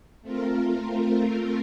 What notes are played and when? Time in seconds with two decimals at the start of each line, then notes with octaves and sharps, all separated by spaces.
0.22 A3 C4 F4 A#4